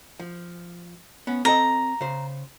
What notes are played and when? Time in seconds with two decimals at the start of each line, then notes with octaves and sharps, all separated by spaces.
0.20 F3
1.27 B3 C#4
1.45 C4 A4 D#5 A#5
2.01 C#3 C5